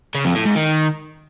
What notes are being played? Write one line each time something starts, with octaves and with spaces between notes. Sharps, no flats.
C#3
F2
A2
G#2
D#3